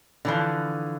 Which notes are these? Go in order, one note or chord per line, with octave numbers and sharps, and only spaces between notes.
D3 E3 F3